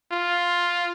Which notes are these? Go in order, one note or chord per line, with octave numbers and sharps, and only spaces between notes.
F4